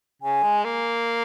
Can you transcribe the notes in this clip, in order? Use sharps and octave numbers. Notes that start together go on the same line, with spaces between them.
C#3 G#5
G#3
A#3